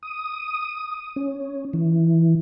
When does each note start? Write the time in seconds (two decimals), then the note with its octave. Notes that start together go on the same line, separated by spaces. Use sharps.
0.03 D#6
1.16 C#4
1.73 E3